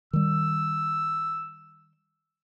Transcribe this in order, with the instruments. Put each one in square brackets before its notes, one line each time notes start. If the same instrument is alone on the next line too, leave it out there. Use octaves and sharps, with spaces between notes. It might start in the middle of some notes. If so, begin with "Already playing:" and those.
[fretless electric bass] D#3 G3 [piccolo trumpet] E6